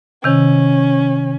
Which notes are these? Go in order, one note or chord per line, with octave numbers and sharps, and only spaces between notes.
C3 D#3 C#4